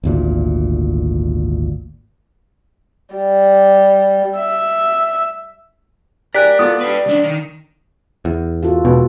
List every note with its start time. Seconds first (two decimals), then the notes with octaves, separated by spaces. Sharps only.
0.03 G#1 D2 A#2
3.15 G3
4.37 E5
6.34 G4 A#4 D5 G#5 F#6 B6
6.59 B3 F4 A4 D6 D#6
6.80 G4 B4
7.06 C2 D4
7.24 D#3
8.25 E2
8.63 F4 F#4 A4
8.85 E1 B2